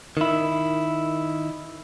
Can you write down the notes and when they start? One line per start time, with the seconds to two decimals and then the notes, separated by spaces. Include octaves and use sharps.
0.17 D#3 E4